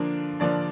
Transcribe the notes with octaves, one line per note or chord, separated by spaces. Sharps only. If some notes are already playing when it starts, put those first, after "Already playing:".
Already playing: D3 F3 A#3 D4
D3 F3 A#3 D4 D5